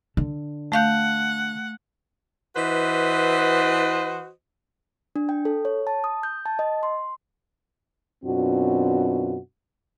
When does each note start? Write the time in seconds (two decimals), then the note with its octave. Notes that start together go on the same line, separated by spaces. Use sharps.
0.17 D3
0.72 A3 F5 F#5 G6
2.56 E3 F#4 B4 C5 D#5
5.16 D4
5.29 G5
5.45 A4
5.65 C#5
5.87 A5
6.04 D#6
6.23 G6
6.46 A5
6.59 D#5
6.83 C6
8.24 F#2 B2 C4 D4 F4 F#4